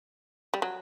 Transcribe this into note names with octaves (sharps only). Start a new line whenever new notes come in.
G3
F#3